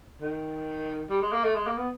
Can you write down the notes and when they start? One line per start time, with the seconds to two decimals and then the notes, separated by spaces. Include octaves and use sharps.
0.21 D#3
1.10 G3
1.22 G#3
1.33 A#3
1.44 A3
1.55 G#3
1.67 A#3
1.78 B3